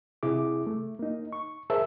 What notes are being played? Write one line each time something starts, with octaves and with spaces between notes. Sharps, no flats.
C3 E4 G#4 D6
A3
A#3 D#4
C#6
G#4 A#4 C5 E5 A5 E6